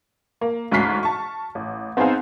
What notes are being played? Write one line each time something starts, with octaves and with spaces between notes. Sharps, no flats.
A#3
D2 G#2 C#4 F6 B6 C7
A5 C#6
A1
B3 C4 D#4 G#4 C5 F5